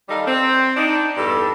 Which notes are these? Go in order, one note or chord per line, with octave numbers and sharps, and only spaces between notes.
D#3 G3 D#4 A4 F5
C4
D4 D#4
E2 G2 A4